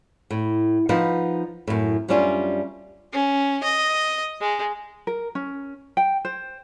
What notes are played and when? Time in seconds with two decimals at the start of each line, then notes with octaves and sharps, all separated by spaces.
0.31 A2
0.89 F3 D#4 B4 F#5
1.68 F#2 A2
2.08 F#2 G3 A3 C#4 D4 F4
3.13 C#4
3.63 D#5
4.41 G#3
5.07 A#4
5.35 C#4
5.97 G5
6.25 C5